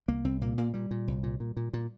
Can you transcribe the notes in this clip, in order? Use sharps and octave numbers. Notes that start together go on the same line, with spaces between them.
C2 A#3
C2 C4
A#2 A#3
A#2 A#3
A#2 G3
A#2
C2
A#2
A#2
A#2
A#2